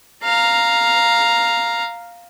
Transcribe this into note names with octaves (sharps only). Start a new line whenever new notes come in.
F5 A#5